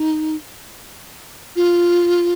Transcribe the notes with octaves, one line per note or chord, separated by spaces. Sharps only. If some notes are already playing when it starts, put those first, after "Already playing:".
Already playing: D#4
F4